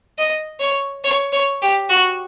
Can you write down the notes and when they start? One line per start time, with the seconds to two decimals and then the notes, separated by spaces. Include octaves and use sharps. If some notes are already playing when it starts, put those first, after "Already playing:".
0.18 D#5
0.61 C#5
1.04 C#5
1.32 C#5
1.62 G4
1.90 F#4